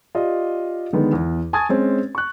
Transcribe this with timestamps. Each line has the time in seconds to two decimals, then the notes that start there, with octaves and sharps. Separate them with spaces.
0.15 F4 G4 D5 D#5
0.93 D3 D#3 G#3 B3
1.13 E2
1.53 G#5 A5 C#6 D#6 G#6 A6
1.69 G#3 C4 C#4
2.15 C#6 F#6